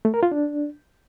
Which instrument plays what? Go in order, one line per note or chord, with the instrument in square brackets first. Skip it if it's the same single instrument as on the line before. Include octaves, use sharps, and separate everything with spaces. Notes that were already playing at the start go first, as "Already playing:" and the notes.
[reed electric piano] A3
A#4
F4
D4